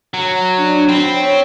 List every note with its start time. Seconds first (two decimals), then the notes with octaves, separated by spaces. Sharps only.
0.14 F#3
0.57 D4
0.89 C4 B5
1.16 C#5